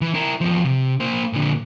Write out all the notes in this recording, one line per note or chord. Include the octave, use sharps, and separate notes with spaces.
E3
E4 A#4
E2 F3
C3
A#3 C5
A#2 D3